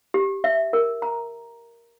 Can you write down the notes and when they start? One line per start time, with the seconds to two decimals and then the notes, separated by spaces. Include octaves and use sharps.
0.14 G4
0.44 E5
0.73 A#4
1.02 A#5